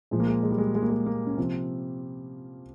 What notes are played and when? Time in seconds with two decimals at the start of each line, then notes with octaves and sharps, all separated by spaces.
0.11 A#2 F3 G#3
0.20 A#3
0.27 G#3
0.43 G#3
0.51 G3
0.58 G#3
0.75 G#3
0.82 A#3
0.90 G#3
1.06 A#3
1.27 C#4
1.38 C3 F3 C4